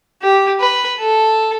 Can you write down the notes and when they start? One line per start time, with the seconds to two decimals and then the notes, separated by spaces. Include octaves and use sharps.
0.21 G4
0.60 B4
0.99 A4